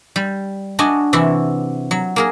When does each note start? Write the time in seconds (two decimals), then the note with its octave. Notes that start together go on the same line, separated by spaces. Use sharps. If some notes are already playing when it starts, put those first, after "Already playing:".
0.16 G3
0.79 D4 F#4 D#5 G#5
1.13 C3 E3 E4 F#4
1.91 F#3
2.16 A#3 G#4 A#4